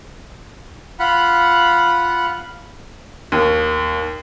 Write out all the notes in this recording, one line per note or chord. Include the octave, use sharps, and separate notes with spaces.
F4 F#5 B5
D#2